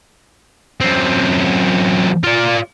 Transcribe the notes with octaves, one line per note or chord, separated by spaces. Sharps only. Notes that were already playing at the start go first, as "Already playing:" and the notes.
F#2 C4
F4 D5